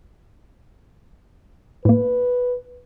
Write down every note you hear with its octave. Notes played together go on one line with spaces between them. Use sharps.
A2 A#3 B4